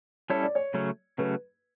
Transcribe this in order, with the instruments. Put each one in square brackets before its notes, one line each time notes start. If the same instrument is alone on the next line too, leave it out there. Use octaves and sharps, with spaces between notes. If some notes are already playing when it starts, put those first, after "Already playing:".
[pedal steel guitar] G3 C#4 E4 A4 [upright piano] C#5
[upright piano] D5
C#5
[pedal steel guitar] C#3 F#3 A3 C#4
[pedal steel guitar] C#3 F#3 A3 C#4 [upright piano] B4